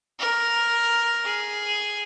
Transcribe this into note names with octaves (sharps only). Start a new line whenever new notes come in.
A#4
G#4